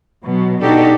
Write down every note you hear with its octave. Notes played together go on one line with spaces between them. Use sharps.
B2 F#3
B2 D4 D#4 F#4 G4 A4